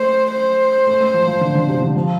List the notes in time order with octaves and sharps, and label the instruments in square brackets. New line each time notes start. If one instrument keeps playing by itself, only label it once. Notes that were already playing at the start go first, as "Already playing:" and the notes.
Already playing: [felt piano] A3 [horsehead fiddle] C5
[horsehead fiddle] C5
[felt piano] A3
A3
F3
F3
D3
D3
C3
D3
F3